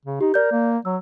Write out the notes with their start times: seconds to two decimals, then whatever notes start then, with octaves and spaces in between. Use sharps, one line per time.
0.05 C#3
0.21 D#4 G4
0.34 A#4 D5 G6
0.52 A#3
0.85 F#3 E6